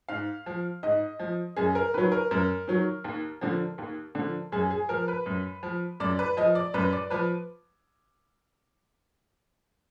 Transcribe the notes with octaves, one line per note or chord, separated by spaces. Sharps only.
G#2 F5
F3
G#2 D#5
F3
F#2 G#4
A#4
D#3 F#3 B4
A#4
F#2 A#4
D#3 F#3
D#2
D3 F3
D#2
D3 F3
F#2 G#4
G#4
F3 A#4
B4
F#2
F3
F#2 D5
B4
F3 D#5
D5
F#2 B4
D5
F3 B4